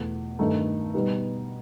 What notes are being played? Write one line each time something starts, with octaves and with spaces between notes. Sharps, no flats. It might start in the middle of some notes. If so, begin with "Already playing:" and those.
Already playing: E2 B2 A3
G2 D#3 A3 D#4
B2 G3 B3 D#4